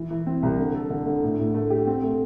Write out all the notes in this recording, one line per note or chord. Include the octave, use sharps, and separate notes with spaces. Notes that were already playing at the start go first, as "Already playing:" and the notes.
Already playing: E3
E3
C4
C2
D3
A4
D3
D3
A2
A2
A3
G4
C4
A3